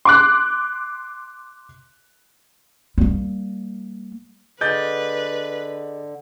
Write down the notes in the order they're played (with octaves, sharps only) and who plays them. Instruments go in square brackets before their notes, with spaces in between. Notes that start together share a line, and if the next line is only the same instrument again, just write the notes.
[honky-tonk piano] C6 D6 F#6
[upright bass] G3 A#3
[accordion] D3 [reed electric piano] G#4 D#5 D6 [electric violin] B4 [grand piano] G6 A6